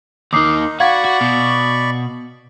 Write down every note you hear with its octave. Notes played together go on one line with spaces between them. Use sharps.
D#2 D#3 D#4 D6 D#6 C7
F#4 D5 F5 F#5 B5 C#6 G#6
F#4
B2